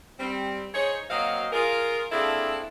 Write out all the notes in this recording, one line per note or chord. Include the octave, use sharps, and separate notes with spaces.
G3 C4
D#4 G#4 C5 C#5
F#3 A#3 C4 F#4 D#5 F5
F4 G#4 A#4
A#3 C4 D4 E4 G#4 A4